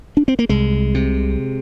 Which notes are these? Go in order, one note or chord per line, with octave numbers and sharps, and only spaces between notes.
D4
C4
A#3
C2 G#3
C3